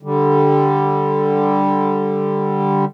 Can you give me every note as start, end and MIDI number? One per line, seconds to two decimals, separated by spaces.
0.03 2.85 50
0.03 2.85 55